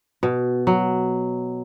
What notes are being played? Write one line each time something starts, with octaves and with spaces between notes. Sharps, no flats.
B2
F#3